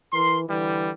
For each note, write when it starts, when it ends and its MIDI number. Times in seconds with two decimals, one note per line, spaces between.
0.13 0.46 52
0.13 0.39 70
0.13 0.39 84
0.48 0.90 50
0.48 0.91 52
0.48 0.90 55